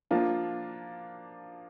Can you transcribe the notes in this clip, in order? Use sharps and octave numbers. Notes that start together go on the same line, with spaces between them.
F3 A#3 D4 F4